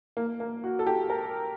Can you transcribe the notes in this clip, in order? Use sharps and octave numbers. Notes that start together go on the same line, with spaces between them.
A#3
A#3
F#4
A4
G4
A#4